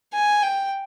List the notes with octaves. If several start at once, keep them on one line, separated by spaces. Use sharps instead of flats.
G#5
G5